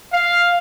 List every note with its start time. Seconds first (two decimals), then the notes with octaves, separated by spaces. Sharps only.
0.12 F5